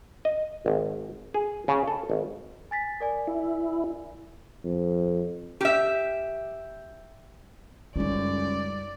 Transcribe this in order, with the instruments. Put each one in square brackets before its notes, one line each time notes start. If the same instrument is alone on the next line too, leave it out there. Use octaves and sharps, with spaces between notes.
[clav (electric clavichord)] D#5
G#1
G#4
C#3
A4
G#1
[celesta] G#5 A6 B6
A#4 D5 G#5
[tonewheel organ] E4
[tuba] F2
[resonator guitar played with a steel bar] G4 E5
[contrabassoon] C#2 [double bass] F#2 [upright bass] G3 D#4 [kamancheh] D5